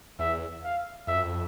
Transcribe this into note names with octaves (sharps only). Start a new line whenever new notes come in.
E2 E5
F5
F2 E5
F#2
F2